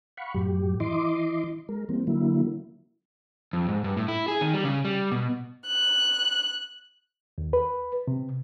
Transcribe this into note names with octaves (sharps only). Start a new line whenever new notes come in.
F5 F#5 B5 C#6
F#2 A2 F#3 G4
E3 E4 D#5 C6 D6
G#3 A#4
E3 G3 A#3 C4
D3 F#3 A#3 E4
F2
G#2
G2
A2
E4
G#4
D#3
G3
C#3
G3
B2
F#6
D#2
B4
C3